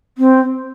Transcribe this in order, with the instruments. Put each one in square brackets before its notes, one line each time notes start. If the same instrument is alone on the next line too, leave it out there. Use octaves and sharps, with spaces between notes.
[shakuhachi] C4